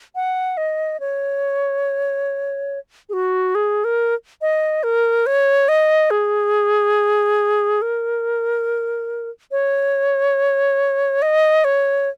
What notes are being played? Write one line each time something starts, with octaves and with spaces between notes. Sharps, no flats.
F#5
D#5
C#5
G#4
F#4
G#4
A#4
D#5
A#4
C#5
D#5
G#4
A#4
C#5
D#5
C#5